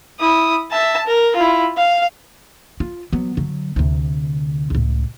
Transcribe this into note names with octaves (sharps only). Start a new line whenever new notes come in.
E4 D#6
E5 A5
A#4
E4 F4
F5
F4
F#3 B3
D3 F#3
D2 C3
C#2 A2